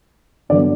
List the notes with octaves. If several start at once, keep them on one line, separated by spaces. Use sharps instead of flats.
G2 D3 F#3 B3 D5